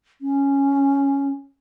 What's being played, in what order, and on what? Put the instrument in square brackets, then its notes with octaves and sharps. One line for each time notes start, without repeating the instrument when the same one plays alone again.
[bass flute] C#4